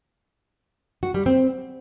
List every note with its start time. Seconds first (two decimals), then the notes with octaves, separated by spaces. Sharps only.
1.03 F#4
1.14 G3
1.26 C4